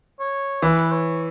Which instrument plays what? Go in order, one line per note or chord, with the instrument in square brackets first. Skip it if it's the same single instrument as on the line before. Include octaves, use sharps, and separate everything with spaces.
[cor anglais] C#5
[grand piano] E3 [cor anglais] B4
[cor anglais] C#5